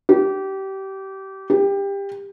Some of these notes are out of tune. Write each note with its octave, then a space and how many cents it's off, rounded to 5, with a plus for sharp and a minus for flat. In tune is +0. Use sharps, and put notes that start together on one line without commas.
G4 -25
G4 +20